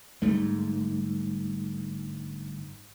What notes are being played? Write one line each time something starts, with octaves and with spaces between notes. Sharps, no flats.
G1 G#2 G3 A3